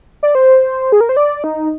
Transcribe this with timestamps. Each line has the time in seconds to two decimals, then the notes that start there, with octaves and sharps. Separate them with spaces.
0.23 D5
0.35 C5
0.92 G#4
1.01 A#4
1.09 C5
1.17 D5
1.44 D#4